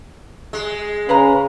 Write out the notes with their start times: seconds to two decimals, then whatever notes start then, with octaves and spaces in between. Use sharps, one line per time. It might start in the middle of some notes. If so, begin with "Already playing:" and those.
0.53 G#3
1.09 C#3 B4 F5 A#5